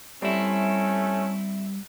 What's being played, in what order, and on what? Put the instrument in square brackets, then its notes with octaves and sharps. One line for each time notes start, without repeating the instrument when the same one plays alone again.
[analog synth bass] G3 [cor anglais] A3 [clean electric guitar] C4 E4 [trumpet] C#4